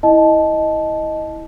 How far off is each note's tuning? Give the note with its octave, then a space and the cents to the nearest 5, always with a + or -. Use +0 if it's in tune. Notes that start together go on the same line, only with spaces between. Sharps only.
E4 -15 D#5 +0 A5 -15